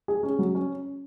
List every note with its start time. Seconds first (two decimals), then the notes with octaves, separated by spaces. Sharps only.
0.08 G#4
0.23 C#4
0.39 F#3
0.55 C#4